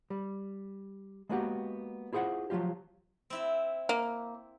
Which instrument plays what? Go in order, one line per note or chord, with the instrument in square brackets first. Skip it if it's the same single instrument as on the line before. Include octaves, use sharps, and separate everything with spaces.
[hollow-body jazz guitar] G3
G#3 A#3 B3 D4 F#4 G4
E4 F4 G#4 C5 F#5
F3 F#3 A3 F4 G4
[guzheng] C4 E4 E5
[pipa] A#3